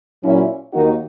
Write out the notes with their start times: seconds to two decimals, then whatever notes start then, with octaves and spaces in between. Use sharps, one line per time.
0.23 A#2 F#3 C#4 E4
0.73 D#2 D#3 A#3 D#4 F#4